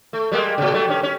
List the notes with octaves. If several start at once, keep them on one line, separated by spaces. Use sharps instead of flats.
A3
G3 G#3 A#3
A2 C#3
F#3 G3 A3
G2 C#4
C#4